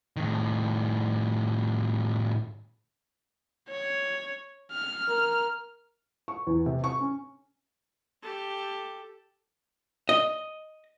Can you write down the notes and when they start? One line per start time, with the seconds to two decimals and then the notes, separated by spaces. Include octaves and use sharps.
0.17 A2 D#3
3.69 C#5
4.72 F6
5.09 A#4
6.28 C#6
6.47 E2
6.66 C3
6.84 C#6
7.00 C#4
8.22 G4 A4
10.09 D#5